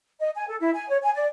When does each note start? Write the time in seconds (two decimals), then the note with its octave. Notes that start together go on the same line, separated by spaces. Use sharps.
0.20 D#5
0.36 G#5
0.49 A4
0.61 E4
0.75 G#5
0.89 C#5
1.03 G#5
1.15 D5